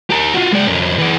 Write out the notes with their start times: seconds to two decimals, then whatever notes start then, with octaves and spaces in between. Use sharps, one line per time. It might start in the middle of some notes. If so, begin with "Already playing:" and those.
0.11 G4 A#4
0.34 F4 F#4
0.53 G#3 D5
0.67 F2 C#4
0.99 E3 D5